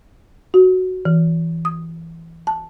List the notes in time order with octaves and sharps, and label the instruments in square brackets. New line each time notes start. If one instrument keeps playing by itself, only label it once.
[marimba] F#4
E3
D#6
A5